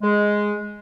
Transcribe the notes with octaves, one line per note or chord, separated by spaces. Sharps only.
G#3